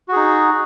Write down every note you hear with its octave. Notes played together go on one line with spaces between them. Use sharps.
D#4 F#4 G#4